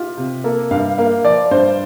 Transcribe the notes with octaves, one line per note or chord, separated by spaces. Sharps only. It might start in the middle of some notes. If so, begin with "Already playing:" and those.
Already playing: F4 G4
C3
A#3 A4
G2 F5
A#3 F5
F3 D5
G2 C5